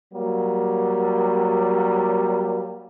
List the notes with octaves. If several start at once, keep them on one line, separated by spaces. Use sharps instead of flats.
F#3 G3 A#3